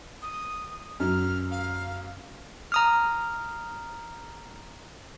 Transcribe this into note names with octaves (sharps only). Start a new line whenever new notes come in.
D#6
F#2 F6
F5
A#5 D#6 F6